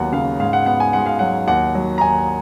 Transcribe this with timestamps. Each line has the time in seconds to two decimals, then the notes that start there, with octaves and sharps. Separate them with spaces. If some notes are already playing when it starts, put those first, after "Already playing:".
Already playing: D#2 F#3 B3 F#5 A#5
0.12 C#3 F5
0.39 G#2 F5
0.53 F#5
0.66 B3 F#5
0.80 G#5
0.93 G#2 F#5
1.06 F5
1.19 F#3 F#5
1.47 D#2 F#5
1.75 F#3
1.98 A#5
2.01 D#2 G#5